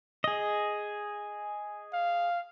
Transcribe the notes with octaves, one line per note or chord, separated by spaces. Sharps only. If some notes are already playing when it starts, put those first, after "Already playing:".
G#4 D#5
F5